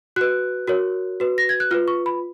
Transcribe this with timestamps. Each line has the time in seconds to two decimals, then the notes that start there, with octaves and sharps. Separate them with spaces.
0.16 F#4 B4 F#6
0.68 F#4 A#4 C#5
1.20 F#4 B4
1.38 A#6
1.49 G#6
1.60 F#6
1.71 F4 B4 F6
1.88 C#6
2.06 B5